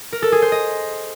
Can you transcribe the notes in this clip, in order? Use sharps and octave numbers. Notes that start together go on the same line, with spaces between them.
A#4
A4
G#4
C5
D#5